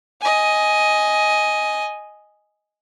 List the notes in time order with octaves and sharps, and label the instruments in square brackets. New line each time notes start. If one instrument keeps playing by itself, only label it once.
[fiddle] D#5 G#5